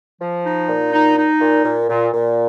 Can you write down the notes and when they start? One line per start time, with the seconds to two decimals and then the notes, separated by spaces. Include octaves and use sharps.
0.21 F3
0.45 D#4
0.69 A#2
0.93 D#4
1.18 D#4
1.40 A#2
1.64 A#2
1.89 A#2
2.13 A#2